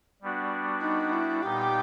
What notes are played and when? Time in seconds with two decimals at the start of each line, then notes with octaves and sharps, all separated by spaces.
0.22 G3 B3 D4 F#4
0.82 D#4
1.12 E4
1.42 A#2 G3 B3 D#4 G4